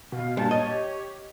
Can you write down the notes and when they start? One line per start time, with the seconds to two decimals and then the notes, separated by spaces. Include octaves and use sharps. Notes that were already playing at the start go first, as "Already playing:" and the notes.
0.12 B2 F5
0.37 G2 A#2 A5
0.51 C#5 D#5
0.64 G4